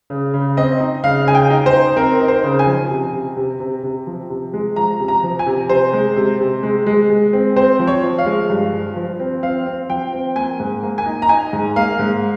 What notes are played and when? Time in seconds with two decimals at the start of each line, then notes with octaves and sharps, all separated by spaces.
0.10 C#3
0.34 C#3
0.57 C4 D#5
0.80 D#4
1.04 C#3 F5
1.27 C#3 G#5
1.35 G5
1.50 D#4
1.66 C5
1.73 D#4
1.97 C4 A#4
2.21 D#4
2.28 C5
2.43 C#3
2.59 G#5
2.67 F3
2.90 C3
3.13 C3
3.37 C3
3.60 C3
3.83 C3
4.07 F3
4.30 C3
4.53 G#3
4.76 F3 A#5
5.00 C3
5.08 A#5
5.23 F3
5.39 G#5
5.46 C3
5.69 C3 C5
5.93 G#3
6.16 C3
6.40 C3
6.63 G#3
6.87 G#3
7.10 G#3
7.33 C4
7.56 C4 C5
7.79 F3
7.87 C#5
8.03 F3
8.18 F5
8.26 G#3
8.50 G2
8.73 F3
8.96 F3
9.20 C4
9.43 C4 F5
9.66 C4
9.89 F3 G5
10.13 C4
10.36 A#3 G#5
10.60 G#2
10.83 A#3
10.98 G#5
11.06 D#4
11.22 A#5
11.29 D#4 G#5
11.53 G#2
11.76 A#3 F5
11.99 G#2